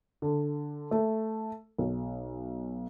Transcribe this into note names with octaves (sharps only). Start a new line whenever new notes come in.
D3
A3
B1